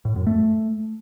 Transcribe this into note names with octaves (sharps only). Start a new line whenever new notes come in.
A2
F#2
A3